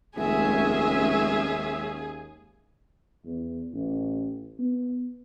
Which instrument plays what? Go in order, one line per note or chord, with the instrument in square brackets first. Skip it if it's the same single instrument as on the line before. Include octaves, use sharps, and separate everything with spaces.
[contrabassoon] F1 [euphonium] D#2 [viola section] G#3 C#4 E5 [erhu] G#4
[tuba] E2
A1
B3